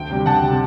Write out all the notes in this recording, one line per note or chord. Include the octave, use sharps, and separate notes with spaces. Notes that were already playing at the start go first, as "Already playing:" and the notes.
Already playing: D2 G5
C3 G3
D2 F#5 A5
C3 G3